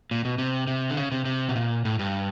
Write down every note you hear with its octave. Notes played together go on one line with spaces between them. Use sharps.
A#2
B2
C3
C3
D3
C#3
C3
C3
B2
A#2
A2
G2